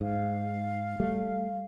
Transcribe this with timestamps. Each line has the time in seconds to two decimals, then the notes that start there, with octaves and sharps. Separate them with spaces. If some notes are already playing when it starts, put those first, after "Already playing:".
0.01 G#2 F5
1.00 G3 A3